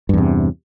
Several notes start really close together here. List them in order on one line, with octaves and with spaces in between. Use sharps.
G2 E2 C3